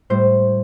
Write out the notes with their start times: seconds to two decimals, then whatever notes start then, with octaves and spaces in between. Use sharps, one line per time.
0.10 A2 G3 C5